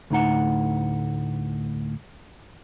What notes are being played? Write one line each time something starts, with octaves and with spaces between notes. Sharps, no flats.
D2 A2 D#4 F#5